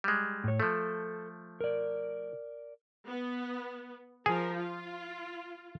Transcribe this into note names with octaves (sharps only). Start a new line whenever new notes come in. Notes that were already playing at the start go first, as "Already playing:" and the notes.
G3 G#3
A2 C#5
F3 A3 A4
A#4 D5
B3
F3 G#4 A#4
F4